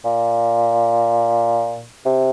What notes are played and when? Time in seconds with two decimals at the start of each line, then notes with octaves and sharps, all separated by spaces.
0.05 A#2
2.05 C3